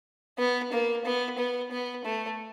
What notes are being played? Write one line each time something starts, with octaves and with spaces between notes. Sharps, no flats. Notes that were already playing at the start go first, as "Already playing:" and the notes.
B3
A#3
B3
B3
B3
A3